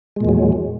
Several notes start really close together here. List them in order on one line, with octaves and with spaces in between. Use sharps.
G#3 A#2 E2 F#3